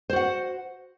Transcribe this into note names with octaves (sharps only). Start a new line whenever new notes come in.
F#4 C5 F#5